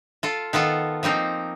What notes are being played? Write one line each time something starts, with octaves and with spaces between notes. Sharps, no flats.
F4 A4
D#3 B3 F4 A4
F3 A#3 C4 D#4